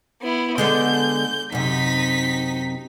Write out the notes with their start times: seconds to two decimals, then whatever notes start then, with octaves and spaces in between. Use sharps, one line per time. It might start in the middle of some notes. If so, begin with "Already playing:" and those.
0.22 B3 E4
0.58 D3 G#3 B3 G6
1.52 F#2 C3 D#4 B6